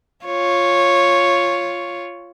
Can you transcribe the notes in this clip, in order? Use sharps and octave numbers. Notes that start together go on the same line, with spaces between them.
F4 C#5